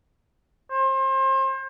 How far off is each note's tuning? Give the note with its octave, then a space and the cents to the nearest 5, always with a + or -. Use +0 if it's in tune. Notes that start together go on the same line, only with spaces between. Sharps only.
C5 +35